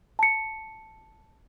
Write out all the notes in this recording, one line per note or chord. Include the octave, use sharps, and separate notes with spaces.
A5 C#7